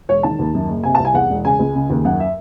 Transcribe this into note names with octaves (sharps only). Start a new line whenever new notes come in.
E1 C#5
D#3 A5
D#2
F#2
F#1
C3 G#5
A5
C2
G#5
E2 F#5
E1
C#3 G#5
C#2
C#3
D#2
F#2 F#5
E5